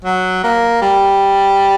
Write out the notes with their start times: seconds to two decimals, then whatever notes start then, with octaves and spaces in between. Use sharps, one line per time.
0.05 F#3
0.44 A#3
0.82 G3